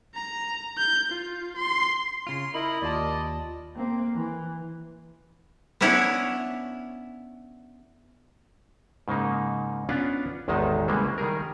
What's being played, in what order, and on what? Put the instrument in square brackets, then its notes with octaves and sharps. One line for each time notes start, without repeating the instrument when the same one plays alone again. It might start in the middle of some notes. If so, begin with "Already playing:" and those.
[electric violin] A#5
G6
F4
C6
[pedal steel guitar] C#3 F4 [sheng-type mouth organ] C6
[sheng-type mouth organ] E4 A#4 D#5 [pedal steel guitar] B5
[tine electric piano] D#2 F4 A5 [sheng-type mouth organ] D5 D#5
[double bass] A#3 C4
E3
[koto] B3 C#4 D4 E4 C#5
[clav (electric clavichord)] G#2 C#3 A#3 D#4
B3 C#4 D4 F4 F5 F#5
A1 E2 D#3 G#3 D#4 A5
C#3 G3 G#3 A#3 C5
D#3 G3 G#4 A#4